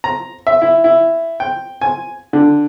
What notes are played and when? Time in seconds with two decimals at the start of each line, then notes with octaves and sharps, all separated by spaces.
0.04 A#5
0.47 E5
0.62 E4
0.84 E4
1.40 G5
1.81 G#5
2.33 D3